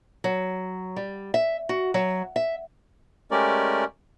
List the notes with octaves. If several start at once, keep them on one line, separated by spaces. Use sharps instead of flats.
F#3
G3
E5
F#4
F#3
E5
G#3 A3 C#4 G4 A#4 D5